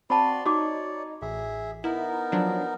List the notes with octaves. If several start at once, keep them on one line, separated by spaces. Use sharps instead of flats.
C4 F#4 D5 A5 B5 C6
D#4 F#4 C#5 D5 D6
A1 G#4 E5
B3 D#4 E4 A#4
F3 F#3 D4